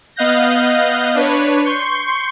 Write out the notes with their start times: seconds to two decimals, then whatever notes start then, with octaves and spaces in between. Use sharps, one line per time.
0.16 B3 D#5 F5 F#6 G6 A#6
1.15 D4 B4 C#5
1.65 C6 C#6 G6 C#7